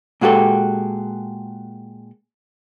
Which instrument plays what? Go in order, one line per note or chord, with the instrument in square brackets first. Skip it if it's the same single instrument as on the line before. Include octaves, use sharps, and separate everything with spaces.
[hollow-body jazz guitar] A#2 G#3 F#4 G4 A4